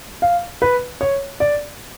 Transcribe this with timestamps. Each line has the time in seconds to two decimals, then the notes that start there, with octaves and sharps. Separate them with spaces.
0.22 F5
0.62 B4
1.01 C#5
1.40 D5